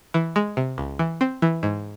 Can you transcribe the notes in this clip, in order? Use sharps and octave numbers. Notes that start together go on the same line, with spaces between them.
E3
G#3
C3
C#2
E3
C4
E3
G#2